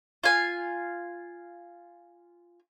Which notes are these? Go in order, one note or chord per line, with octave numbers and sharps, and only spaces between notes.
F4 G#5